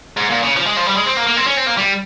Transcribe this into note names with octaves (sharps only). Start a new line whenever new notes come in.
G#2
A#2
C#3
F3
G#3
F3
G3
G#3
C4
A#3
A#3
C4
C#4
C4
A#3
G3